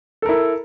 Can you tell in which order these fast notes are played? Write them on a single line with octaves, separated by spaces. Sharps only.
A4 A#4 E4